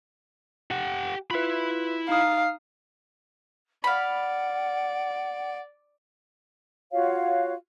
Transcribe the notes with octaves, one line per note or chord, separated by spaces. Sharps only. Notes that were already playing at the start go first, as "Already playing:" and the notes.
G4 F#5
E4 F4 B4 B5
D#4 F5 D#6
D5 F5 F#5 B5
F4 F#4 C#5 F5